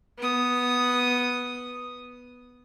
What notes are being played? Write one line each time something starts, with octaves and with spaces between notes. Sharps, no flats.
B3 D#6